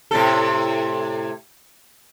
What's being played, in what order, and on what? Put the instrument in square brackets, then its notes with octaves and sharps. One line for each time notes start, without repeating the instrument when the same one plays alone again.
[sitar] A2 C3 A4